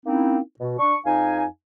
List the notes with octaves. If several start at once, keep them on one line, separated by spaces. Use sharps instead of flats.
A#3 C4 C#4 D#4 E4
B2
D4 C#6
F2 D#4 F5 G#5